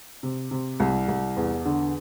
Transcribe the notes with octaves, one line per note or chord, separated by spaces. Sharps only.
C3
C3
C2
C2
E2
D3